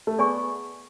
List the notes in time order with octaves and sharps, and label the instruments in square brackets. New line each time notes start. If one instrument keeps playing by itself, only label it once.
[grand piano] A3
[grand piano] B3 [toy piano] G#4 D5 G#5 C#6